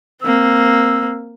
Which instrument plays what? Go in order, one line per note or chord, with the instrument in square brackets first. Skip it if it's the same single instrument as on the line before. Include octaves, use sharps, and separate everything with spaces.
[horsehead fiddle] A#3 C4 [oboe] E6